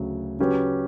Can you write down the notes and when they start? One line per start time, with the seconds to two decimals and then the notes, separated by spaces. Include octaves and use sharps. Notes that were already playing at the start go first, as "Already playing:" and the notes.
Already playing: D2 C#3 F#3
0.39 C#3 F#3 C#4 G4 B4